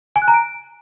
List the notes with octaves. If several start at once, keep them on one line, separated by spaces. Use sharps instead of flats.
G#5
F#6
A#5
D7